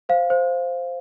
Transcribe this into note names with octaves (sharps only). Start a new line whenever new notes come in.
C5 F5
C5